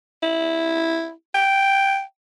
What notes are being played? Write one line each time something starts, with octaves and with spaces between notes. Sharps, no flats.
E4
G5